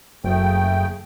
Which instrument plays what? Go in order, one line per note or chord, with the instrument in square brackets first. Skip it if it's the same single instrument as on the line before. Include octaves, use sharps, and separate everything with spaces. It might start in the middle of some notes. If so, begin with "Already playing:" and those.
[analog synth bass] F#1 [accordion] C#3 A3 G5